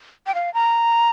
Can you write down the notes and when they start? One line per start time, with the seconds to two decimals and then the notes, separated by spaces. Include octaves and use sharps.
0.27 G5
0.35 F5
0.54 A#5